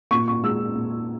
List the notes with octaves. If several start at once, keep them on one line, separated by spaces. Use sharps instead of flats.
A#2 C#6
C#6
G#3 E6
A#2